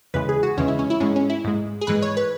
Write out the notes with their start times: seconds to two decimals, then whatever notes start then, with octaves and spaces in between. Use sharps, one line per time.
0.14 E2 C#3 E3 G#3 B4
0.29 G#4
0.43 F#4
0.57 E2 C#3 E3 G#3 C#4
0.68 E4
0.79 C#4
0.90 E4
1.00 G#2 G#3 C#4
1.16 C#4
1.30 E4
1.44 G#2 G#3
1.81 G#4
1.87 G#2 E3 G#3 B4
2.02 C#5
2.17 B4